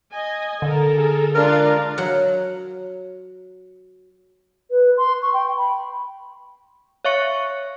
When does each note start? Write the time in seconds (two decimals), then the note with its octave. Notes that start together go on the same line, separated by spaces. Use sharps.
0.12 D#5 G#5
0.62 D3 A4 A#4
0.96 G#4
1.35 G#3 D4 F4 A#4 F5
1.98 F#3 F#5
4.71 B4
4.97 C6
5.22 C#6
5.34 G5
5.57 B5
7.05 C#5 E5 F5 C#6 C#7